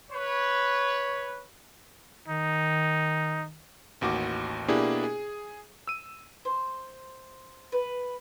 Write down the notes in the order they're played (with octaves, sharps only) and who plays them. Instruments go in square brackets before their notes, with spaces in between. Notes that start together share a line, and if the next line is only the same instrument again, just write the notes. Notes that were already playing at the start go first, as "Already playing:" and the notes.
[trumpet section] B4 C#5
[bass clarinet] D#3 [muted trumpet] D#4
[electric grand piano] A1 D#2 F#4 D6
B2 A#3 D4 E4 G4 G#4
G#4
E6 D#7
[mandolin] C5
B4